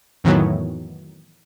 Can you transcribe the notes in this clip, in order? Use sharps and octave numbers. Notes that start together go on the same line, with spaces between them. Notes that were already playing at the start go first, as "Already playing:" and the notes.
F2 A2 D#3 E3 F#3 B3